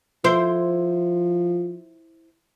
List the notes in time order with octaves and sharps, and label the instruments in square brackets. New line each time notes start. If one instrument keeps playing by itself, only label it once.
[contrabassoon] F3 [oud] E4 C5